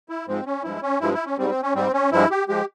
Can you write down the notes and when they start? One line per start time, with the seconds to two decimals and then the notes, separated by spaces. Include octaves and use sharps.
0.09 E4
0.27 G#2 F3 G#3 C4
0.46 C#4
0.63 G2 F3 G#3 E4
0.82 C#4
1.01 G2 F3 G#3 E4
1.14 E4
1.26 C#4
1.38 G#2 G3 C4
1.50 C4
1.62 C#4
1.74 G#2 G3 C4
1.93 C#4
2.12 G2 F3 G#3 E4
2.31 G4
2.49 F3 G#3 G4